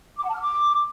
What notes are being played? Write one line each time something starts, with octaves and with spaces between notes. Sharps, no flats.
D6
F#5
A5
F6
D6